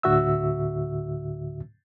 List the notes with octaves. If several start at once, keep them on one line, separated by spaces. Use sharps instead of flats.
D2 A2 D3 F#4 E5 E6